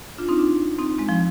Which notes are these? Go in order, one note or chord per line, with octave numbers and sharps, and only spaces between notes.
D4 F4
C4 D#4
D4 F4
C4 D#4
G#3 C4
F3 G#3